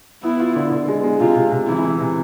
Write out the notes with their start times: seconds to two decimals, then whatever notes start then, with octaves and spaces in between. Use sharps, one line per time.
0.23 B3 E4
0.40 F4
0.55 D3
0.71 D3
0.88 G#3
1.03 G#3
1.20 C3 F4
1.36 C3
1.52 C3
1.67 E3 E4
1.84 E3
2.00 C3